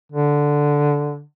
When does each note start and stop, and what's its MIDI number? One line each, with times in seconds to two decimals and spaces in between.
0.12 1.22 50